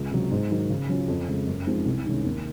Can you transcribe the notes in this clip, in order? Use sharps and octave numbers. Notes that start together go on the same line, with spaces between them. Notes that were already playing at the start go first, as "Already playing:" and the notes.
Already playing: C#2
C3 F#3
G#2
D#3 F#3
C#3
F#3 C#4 F4
F2
C#3 G#3
F#2
F3 G#3 C4 D#4
C2
C3 D#3 G#3 C#4
D#2